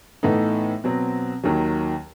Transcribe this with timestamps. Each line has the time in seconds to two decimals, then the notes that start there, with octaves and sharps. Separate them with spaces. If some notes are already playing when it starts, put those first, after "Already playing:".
0.23 A2 E3 B3 D#4 A4
0.84 B2 F#3 C4
1.44 D#2 D#3 F#3